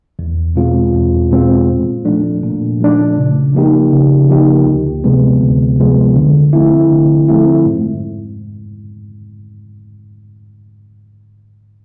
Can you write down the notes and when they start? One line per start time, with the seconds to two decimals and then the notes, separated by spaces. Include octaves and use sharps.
0.19 E2
0.56 B2 G#3 C4 F4
0.94 E2
1.31 B2 G#3 C4 F4
1.69 A#2
2.05 F3 A3 D4
2.43 A#2
2.81 F3 A3 D4
3.17 C#3
3.54 F3 A#3 D#4 G4
3.91 C#3
4.29 F3 A#3 D#4 G4
4.66 D2
5.04 C3 F3 G#3 B3
5.41 D2
5.78 C3 F3 G#3 B3
6.16 D3
6.53 F3 A3 C4 E4
6.90 D3
7.28 F3 A3 C4 E4
7.66 G#2